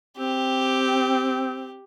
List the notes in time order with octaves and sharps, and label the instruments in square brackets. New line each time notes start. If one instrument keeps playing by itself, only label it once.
[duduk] C4 [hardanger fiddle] G4